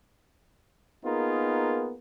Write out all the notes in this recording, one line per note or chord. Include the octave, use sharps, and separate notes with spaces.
A#3 B3 D#4 F4 G#4 A#4